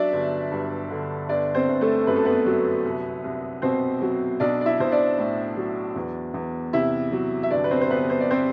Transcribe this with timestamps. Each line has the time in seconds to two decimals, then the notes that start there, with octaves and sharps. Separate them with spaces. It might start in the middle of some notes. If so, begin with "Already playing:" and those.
Already playing: F#3 D4 D5 E5
0.13 G1
0.51 G2
0.90 D3
1.29 G1 D4 D5
1.55 C4 C5
1.68 G1
1.81 A3 A4
2.07 F#2 B4
2.16 A4
2.25 B3 B4
2.46 F#3
2.85 C2
3.24 C2
3.62 B2 C4 C5
4.02 F#3
4.40 B1 D4 D5
4.61 D5
4.66 E4 E5
4.80 B1 C5
4.91 D4 D5
5.18 A2
5.57 F#3
5.96 E2
6.34 E2
6.73 C3 E4 E5
7.12 F#3
7.43 E5
7.51 G1 D4 D5
7.64 B4
7.71 C4 C5
7.81 C5
7.90 G1 B3 B4
8.10 C5
8.21 D5
8.31 C4 C5